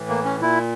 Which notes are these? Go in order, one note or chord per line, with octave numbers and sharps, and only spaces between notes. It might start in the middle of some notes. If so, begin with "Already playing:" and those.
Already playing: A2 E3
A#3
C#4
A#2 E4